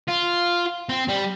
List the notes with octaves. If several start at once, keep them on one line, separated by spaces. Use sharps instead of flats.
F4
C4
G3